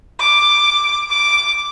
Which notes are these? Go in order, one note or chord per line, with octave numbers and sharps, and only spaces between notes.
D6
D6